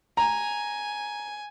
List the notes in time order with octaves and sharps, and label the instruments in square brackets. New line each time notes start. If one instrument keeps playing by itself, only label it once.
[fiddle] G#5 [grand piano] A#5